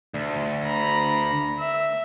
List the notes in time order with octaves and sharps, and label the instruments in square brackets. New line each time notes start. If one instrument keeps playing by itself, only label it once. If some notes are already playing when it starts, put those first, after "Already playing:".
[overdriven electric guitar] D2
[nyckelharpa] A#5 B5
E5